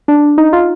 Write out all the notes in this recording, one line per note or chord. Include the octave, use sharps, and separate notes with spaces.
D4
D#4
F4